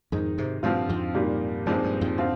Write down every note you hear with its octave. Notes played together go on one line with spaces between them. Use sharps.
F2 G#2 D#3 G#3 D#4
G#2 C3
G2 A#2 D3 F3 C4 F4
F2 G#2
A#2 G3 A#3 D#4
G2 A#2 F3 G#3 C4 D#4
G2
F2 G#2
D3 F3 C4 F4